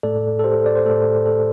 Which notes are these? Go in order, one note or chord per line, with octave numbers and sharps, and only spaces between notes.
A2 A3 A4 D5
A4
G4 C5
D5
C5
A2 A3 A4
A4